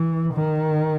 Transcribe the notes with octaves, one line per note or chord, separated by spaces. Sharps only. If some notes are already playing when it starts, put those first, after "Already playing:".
Already playing: E3
D#3